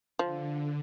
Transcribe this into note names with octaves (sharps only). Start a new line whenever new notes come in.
D3 F3